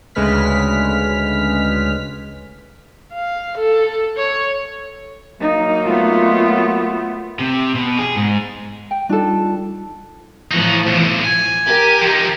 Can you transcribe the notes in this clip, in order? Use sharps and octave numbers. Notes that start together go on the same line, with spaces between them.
D2 C#3 G#3 B4 F6 B6
F5
A4
C#5
F#3 A#3 D#4
A3 B3 F4
C3
B2
G#4
G#2
G5
G3 D4 D#4 F4 A4
A2 E3 F3 D#4 F#4
B1 C3
G#5
G4 A#4
F3 D#4